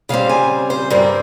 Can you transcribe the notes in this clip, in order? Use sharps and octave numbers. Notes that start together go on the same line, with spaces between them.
C#3 G3 C4 F5
G#5
C5
G2 G3 C4 A#4